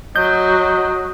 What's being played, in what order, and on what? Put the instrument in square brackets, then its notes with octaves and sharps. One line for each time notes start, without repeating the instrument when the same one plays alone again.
[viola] F#3 [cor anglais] D#5 [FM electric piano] G6